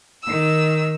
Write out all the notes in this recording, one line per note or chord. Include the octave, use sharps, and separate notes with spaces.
D#3 E6